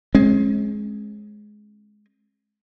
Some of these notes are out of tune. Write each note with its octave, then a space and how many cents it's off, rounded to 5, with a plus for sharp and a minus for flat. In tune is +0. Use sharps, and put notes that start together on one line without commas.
G#3 +15 C#4 -45